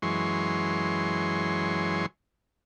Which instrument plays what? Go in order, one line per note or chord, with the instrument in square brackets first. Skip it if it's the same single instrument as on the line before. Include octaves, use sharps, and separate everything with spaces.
[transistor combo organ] F#2 E3 G#3 C#5 C6